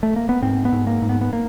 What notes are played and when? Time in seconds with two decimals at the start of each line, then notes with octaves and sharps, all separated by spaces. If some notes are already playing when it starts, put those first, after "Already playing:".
0.03 A3
0.16 A#3
0.29 B3
0.42 G#2 C4
0.65 B3
0.72 G#2
0.87 A#3
1.02 G#2
1.09 B3
1.21 B3
1.33 A#3